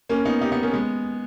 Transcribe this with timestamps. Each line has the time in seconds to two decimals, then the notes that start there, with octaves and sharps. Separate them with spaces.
0.09 A#3 C#4
0.25 B3 D#4
0.41 D#4 G4
0.52 B3 D#4
0.63 A#3 C#4
0.73 G#3 B3